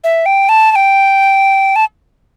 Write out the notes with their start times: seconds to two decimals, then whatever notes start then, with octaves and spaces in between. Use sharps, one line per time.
0.04 E5
0.26 G5
0.49 A5
0.71 A5
0.76 G5
1.76 A5